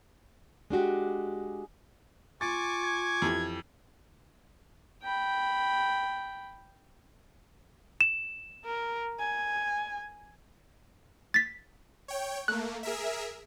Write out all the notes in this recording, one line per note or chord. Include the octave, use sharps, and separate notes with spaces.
G#3 D4 F#4 G4
F4 G#5 C#6 D6 A6
G#6
F2 E3 G4
G5 B5
E7
A#4
G#5
A6 B6
C#5 G5
A3 A#3 F#6
G#4 A#4 E5